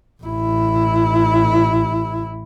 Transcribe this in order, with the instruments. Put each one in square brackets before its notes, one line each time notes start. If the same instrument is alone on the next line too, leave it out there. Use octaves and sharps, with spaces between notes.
[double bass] A1 E4